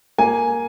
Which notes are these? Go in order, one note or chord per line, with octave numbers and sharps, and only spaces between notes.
A#3 G#5